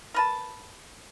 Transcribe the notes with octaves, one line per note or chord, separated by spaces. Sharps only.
A#4 B4 A5